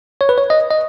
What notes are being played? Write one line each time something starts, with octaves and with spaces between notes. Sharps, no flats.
C#5
B4
C#5
D#5
D#5